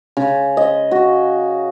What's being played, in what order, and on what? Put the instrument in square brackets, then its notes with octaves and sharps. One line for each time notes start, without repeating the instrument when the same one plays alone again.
[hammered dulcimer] C#3
D#5
F#4